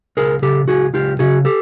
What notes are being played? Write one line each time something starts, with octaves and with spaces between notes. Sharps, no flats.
C#2 G#4 A#4
C#3 G4 A4
C#2 F#4 G#4
C#2 F4 G4
C#3 F#4 G#4
G4 A4